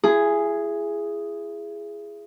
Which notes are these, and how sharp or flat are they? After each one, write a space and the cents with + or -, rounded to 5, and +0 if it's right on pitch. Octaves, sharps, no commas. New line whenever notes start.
E4 +30 G#4 +0